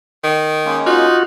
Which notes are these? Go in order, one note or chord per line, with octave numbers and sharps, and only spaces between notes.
D#3
G#3 A#3 C#4
D#4 F4 F#4